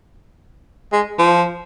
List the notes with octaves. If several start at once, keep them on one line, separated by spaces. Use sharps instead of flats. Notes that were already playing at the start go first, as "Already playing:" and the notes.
G#3
F3